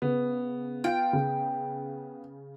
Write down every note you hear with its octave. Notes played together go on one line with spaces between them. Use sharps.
C#3 B3
F4 G5 D7
C#3